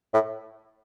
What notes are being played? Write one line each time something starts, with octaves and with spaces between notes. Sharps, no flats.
A2